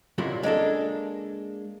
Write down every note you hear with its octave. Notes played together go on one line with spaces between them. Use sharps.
C#2 F#2 A#2 F#3 G3 E4
G#3 A#3 D4 A4